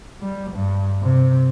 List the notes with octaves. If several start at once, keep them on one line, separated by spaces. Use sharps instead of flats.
G3
G2
C3